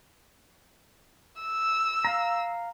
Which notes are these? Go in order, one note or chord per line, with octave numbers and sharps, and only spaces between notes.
E6
F5 A#5